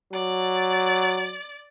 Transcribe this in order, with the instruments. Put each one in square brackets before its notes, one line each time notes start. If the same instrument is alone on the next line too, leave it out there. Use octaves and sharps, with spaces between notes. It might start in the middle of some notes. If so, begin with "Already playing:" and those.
[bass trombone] F#3 [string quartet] D5